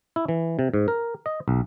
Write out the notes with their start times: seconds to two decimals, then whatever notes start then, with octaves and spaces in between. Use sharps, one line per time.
0.16 E4
0.28 E3
0.59 C3
0.74 G#2
0.88 A#4
1.26 D#5
1.48 B1